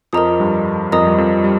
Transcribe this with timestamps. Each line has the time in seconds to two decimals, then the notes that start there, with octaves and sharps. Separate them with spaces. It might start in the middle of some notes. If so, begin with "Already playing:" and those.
0.13 F2 F3 A#4 D#5 A#5 D#6
0.40 G2 G3
0.92 F2 F3 A#4 D#5 A#5 D#6
1.07 G3
1.18 F2 F3
1.44 G3